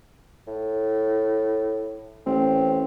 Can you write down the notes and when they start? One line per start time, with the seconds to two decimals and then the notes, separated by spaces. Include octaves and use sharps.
0.48 A2
2.26 A1 C4